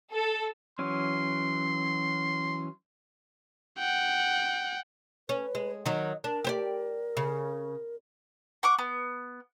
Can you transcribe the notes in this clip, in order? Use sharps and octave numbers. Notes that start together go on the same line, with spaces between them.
A4
E3 F#3 C#4 C6
F#5 G5
C#4 B4
G#3
D#3 F#3 D#5
D4 A#4
G4 C5 D5
C#3
F#5 C#6 D6
B3